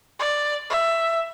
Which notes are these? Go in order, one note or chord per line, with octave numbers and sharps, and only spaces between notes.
D5
E5